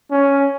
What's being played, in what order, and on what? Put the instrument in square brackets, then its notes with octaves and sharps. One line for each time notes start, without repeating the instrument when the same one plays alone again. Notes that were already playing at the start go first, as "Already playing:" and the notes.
[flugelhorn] C#4